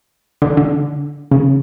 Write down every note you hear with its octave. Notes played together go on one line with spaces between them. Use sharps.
D3
D3
C#3